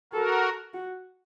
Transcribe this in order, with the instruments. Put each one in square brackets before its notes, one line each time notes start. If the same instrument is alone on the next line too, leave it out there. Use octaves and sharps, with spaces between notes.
[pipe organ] F#4 A#4 [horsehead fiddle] A4
[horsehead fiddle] F#4